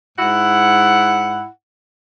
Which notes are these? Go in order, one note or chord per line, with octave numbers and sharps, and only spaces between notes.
G#2 E4 F#5